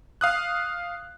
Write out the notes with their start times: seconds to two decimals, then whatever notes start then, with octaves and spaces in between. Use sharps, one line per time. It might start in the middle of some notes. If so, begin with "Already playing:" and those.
0.21 F5 D#6 F#6